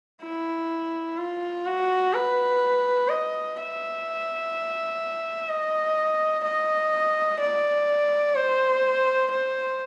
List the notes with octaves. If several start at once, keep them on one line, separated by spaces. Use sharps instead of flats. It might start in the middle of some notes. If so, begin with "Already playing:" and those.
E4
F4
F#4
B4
D#5
E5
D#5
D#5
D5
C5
C5